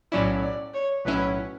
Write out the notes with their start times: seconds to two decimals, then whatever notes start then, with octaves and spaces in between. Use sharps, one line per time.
0.12 B1 A2 F#3 C#4 E4 D5
0.43 D5
0.74 C#5
1.05 B1 A2 F#3 C#4 E4 B4